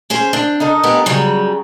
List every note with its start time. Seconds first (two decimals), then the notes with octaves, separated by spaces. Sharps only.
0.10 C#4 G#4 C5
0.33 C4 D4
0.60 D#4 A4 A#4
0.83 G#3 B3 G4
1.06 C#3 F#3 G3 G5 A#5